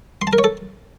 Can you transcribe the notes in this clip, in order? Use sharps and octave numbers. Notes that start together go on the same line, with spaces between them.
C6
A5
A#4
C#5
A4